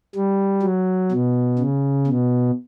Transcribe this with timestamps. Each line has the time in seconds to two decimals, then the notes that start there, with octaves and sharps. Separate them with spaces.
0.15 G3
0.63 F#3
1.11 B2
1.58 C#3
2.06 B2